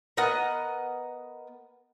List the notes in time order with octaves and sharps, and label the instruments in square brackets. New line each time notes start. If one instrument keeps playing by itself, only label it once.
[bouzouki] B3 A#4 D#5 F#5